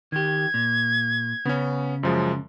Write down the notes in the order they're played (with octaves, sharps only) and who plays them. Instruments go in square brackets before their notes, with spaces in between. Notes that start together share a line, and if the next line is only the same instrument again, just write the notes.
[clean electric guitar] D#3 G4 [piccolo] G#6
[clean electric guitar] A#2
[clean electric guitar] C#3 [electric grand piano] B3 C#4
[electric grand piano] F#2 F3 G#3